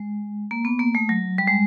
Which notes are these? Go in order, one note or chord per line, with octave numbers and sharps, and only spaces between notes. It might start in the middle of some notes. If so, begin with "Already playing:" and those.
Already playing: G#3
A#3
B3
A#3
A3
F#3
G3
G#3